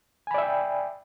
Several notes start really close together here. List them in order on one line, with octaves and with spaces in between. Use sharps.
G#5 B5 D5 E5 G5